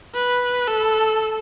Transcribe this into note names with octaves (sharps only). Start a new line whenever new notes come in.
B4
A4